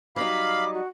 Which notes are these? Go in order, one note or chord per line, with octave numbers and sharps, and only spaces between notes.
F#3 G3 D#4 F5 B5 D6
F#4